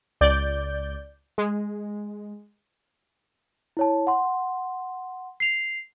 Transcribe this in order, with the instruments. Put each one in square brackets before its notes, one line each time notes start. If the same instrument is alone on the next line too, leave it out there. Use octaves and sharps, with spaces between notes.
[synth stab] C#2 D5 G6
G#3
[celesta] E4 C#5 A5
F#5 C6
C7 F7